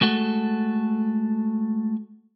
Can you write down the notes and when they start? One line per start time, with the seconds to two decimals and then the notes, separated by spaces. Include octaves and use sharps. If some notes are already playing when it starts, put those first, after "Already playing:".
0.01 G#3 A3 F#4 A4